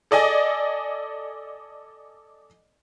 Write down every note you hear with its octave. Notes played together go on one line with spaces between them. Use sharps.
A4 D5 D#5 G#5